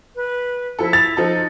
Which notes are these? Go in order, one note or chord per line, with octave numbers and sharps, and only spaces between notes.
B4
F3 E4 A4
A6 F7
F3 D#4 A4